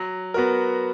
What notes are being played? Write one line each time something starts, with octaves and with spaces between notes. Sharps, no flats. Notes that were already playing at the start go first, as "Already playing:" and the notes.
Already playing: F#3
B3 F#4 A#4